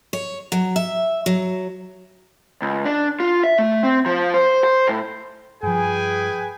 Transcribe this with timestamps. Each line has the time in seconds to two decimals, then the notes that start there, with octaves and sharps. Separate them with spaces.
0.13 C#5
0.52 F#3
0.76 E5
1.26 F#3
2.62 C#2
2.85 D4
3.20 F4
3.44 E5
3.59 A3
3.83 C4
4.06 F3
4.34 C5
4.64 C5
4.87 A2
5.63 G2 F3 G#4 B4 G5 G#5